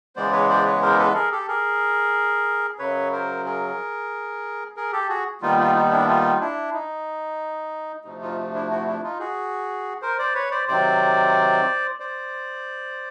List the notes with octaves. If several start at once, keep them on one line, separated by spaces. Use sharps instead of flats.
E2 C#3 E3 G#3 B3 C5 D5
B4 C#5
C5 D5
B4 C#5
A#4 C5
A4 B4
G#4 A#4
G4 A4
G#4 A#4
F#2 C#3 F#3 B4 C#5
A#4 C5
G#4 A#4
G#4 A#4
G4 A4
F#4 G#4
D#2 D#3 G3 B3 D#4 F4
D#4 F4
D#4
D4 E4
D#4 F4
D4 E4
D#4
D2 C3 F3 A3 D#4
D#4 F4
D4 E4
E4 F#4
D4 E4
D#4 F4
F#4 G#4
A#4 C5
C5 D5
B4 C#5
C5 D5
C3 D#3 F#3 C5 D5
C5 D5